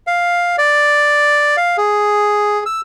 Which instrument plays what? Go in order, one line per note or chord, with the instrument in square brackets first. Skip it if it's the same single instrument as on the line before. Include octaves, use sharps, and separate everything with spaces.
[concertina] F5
D5
F5
G#4
E6